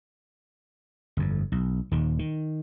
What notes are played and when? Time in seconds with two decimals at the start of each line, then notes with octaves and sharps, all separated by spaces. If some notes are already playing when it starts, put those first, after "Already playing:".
1.17 G1 F2
1.52 B1
1.92 D#1 D#2 D#3
2.19 D#3